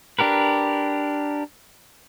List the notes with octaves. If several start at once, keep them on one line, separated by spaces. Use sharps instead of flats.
D4 G4 A#4 B4